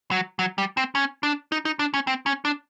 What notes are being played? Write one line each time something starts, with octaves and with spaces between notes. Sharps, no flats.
F#3
F#3
G3
C4
C#4
D4
D#4
D#4
D4
C#4
C4
C#4
D4